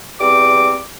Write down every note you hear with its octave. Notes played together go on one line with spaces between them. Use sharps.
E2 G3 C4 D6